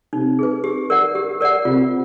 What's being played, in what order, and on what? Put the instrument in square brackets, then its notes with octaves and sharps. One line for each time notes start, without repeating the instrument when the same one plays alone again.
[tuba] C3 [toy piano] D#4
[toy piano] G#4 B4
G4
A#4 D5 F#5
G4
A#4 D5 F#5
[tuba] C3 [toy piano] F4